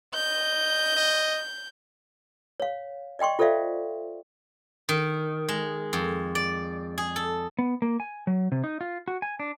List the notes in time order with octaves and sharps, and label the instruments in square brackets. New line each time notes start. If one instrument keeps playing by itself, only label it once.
[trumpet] D#5 [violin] G6
[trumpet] D#5
[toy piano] C#5 F5
D5 D#5 G5 C6 C#6
F4 A4 C5 D5 E5 F5
[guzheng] D#3
G#3
F2
D5
G#4
A4
[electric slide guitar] B3
A#3
G#5
F#3
C3
D#4
F4
F#4
G#5
D4